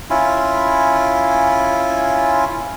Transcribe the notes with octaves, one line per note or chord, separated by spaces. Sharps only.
C#4 E4 F4